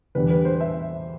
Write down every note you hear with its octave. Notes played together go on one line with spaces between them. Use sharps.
E2 D3 G3 B4
B4
C5
E5